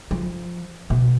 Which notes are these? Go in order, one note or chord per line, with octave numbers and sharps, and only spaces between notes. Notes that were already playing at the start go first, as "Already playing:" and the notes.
F3
B2